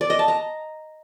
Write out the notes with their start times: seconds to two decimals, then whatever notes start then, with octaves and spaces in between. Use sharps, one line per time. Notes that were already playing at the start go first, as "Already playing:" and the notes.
0.01 D5
0.10 D#5
0.19 A5
0.28 A#5